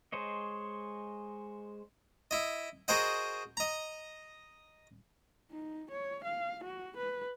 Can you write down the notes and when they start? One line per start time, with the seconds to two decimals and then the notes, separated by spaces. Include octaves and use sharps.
0.12 G#3 C5 C#5 D#5
2.31 E4 D#5
2.88 F#4 G#4 A#4 C5 D#5 F#5
3.57 D#5 A#5
5.51 D#4
5.92 C#5
6.25 F5
6.64 F#4
6.98 B4